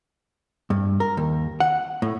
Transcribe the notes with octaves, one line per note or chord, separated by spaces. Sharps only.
G2
A#4
D#2
F#5
A2